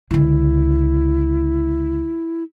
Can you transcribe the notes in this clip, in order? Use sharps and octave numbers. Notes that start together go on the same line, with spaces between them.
C#2 D3 E4